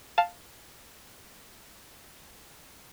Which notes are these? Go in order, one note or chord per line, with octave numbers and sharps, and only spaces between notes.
F5 A5